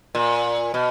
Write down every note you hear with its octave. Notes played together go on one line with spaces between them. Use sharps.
A#2
B2